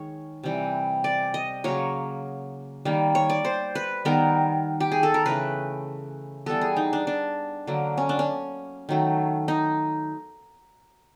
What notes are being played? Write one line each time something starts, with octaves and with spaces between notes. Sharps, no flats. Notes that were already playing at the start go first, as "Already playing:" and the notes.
Already playing: D#3 G#3 C#5
C3 E3 G3
D5
D#5
C#3 F#3 A#3 C#5
D#3 G3 A#3
C#5
D5
C5
B4
D#3 G3 B3 A#4
G4
G#4
A4
A#4
C#3 E3 A3 B4
E3 G3 B3 A4
G#4
D#4
D4
D4
D3 F#3 A#3
C#4
D4
C#4
D#3 F#3 A3
D#4